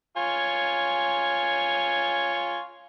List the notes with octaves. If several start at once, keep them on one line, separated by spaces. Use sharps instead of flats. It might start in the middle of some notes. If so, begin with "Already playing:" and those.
F4 C#5 G#5